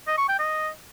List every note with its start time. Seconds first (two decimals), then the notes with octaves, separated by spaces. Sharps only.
0.07 D#5
0.18 C#6
0.28 G5
0.39 D#5